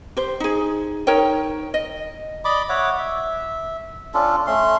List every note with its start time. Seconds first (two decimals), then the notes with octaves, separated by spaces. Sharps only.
0.17 G4 C5
0.40 D#4 G#4
1.07 D#4 A#4 C#5 G5
1.74 D#5
2.45 D5 D#5 B5 D6
2.69 C#5 E5 F#5 D6
2.98 E5
4.14 C#4 D4 F4 A4
4.47 A3 C#4 C6